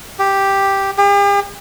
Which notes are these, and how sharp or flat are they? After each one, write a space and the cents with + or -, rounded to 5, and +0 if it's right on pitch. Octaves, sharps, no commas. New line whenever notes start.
G4 +0
G4 +45